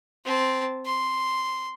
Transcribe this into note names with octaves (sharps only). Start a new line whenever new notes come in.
C4 A5
C6